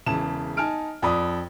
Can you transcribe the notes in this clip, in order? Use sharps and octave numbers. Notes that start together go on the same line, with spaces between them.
E1 C#3 E3 A5 E7
D#4 G#5 A5 F6 D7
F2 D5 B5 D#6